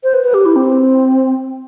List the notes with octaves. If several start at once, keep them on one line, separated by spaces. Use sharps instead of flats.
C5
B4
B4
G4
E4
C4